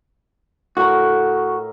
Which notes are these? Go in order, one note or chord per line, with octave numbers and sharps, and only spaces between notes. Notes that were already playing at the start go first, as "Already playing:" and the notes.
A2 F#4 A#4